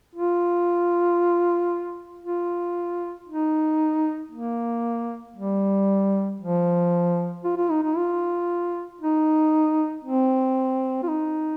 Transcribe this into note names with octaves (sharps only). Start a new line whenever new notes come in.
F4
F4
D#4
A#3
G3
F3
F4
F4
D#4
D#4
F4
D#4
C4
F4
D#4